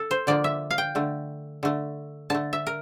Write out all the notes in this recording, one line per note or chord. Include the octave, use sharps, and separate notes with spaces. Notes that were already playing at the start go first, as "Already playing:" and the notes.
Already playing: A4
C5
D3 F3 A#3 D5
E5
F5
G5
D3 A3
D3 A3
D3 A3 A5
E5
A#4